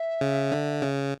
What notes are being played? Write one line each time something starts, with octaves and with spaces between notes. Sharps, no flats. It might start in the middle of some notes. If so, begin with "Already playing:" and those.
Already playing: E5
C#3
D3
C#3